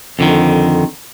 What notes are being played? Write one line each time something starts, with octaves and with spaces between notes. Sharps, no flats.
F2 D3 D#3